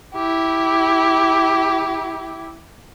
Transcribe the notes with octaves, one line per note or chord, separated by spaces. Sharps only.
E4 G4